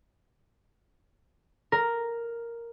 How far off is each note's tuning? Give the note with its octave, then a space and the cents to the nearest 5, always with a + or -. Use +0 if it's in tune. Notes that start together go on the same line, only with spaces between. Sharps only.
A#4 +0